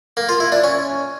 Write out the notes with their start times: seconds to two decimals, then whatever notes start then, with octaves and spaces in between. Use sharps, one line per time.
0.17 A#3
0.29 F4
0.40 E4
0.52 D4
0.64 C#4